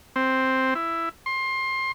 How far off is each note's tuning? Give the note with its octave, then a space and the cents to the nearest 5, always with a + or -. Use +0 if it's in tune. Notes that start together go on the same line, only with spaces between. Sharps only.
C4 +5
E4 +10
C6 +25